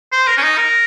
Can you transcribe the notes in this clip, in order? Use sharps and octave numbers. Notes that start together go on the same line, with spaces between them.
C5
A#4
C#4
D#4
A#4